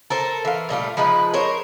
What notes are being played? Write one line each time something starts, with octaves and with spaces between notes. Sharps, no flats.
A4 A#4 C5
E3 F5
A#2 G3 A3 F4
F3 G#3 D#4 B4
A#4 C5 C#5